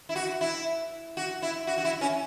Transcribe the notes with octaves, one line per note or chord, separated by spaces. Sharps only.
E4
F#4
E4
F#4
E4
F#4
F#4
E4
C#4